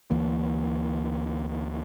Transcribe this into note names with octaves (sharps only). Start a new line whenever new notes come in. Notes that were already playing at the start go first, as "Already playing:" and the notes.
D2 E3 A#3